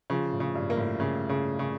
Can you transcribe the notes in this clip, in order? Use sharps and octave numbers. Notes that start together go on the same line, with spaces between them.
C#3 F3
A2
C#3
G2
A#3
A2
A2 C#3
C#3
C#3